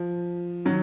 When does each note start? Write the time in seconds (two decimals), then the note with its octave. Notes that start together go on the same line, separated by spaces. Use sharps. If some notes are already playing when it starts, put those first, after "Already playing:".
Already playing: F3
0.65 D#3 F#3